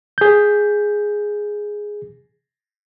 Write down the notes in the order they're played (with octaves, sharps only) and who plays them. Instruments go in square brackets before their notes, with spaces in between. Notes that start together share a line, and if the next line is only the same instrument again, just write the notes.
[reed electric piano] G#4 G6